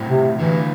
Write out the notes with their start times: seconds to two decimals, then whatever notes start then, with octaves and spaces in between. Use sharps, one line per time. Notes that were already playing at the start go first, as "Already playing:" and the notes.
Already playing: A2 A3 C4 E4
0.09 C3
0.38 D3 E3 A3 E4